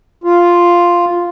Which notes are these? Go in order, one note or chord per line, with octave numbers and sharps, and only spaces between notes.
F4